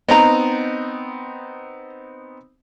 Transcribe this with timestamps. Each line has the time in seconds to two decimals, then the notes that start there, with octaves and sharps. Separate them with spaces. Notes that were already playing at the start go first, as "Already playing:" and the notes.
0.08 B3 C4 D#4 D#5 A#5